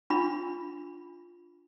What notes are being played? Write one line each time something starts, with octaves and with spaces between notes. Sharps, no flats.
D4 F4 B5